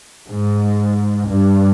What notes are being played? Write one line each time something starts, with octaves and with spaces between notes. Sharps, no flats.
G#2
G2